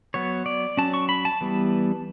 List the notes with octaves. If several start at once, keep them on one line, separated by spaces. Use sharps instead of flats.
F#3 B3 C#5
D5
F#3 C#4 A5
C#6
B5
A5
E3 G3 B3